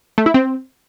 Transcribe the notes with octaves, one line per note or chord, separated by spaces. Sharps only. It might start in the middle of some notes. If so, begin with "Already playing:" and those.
A3
E4
C4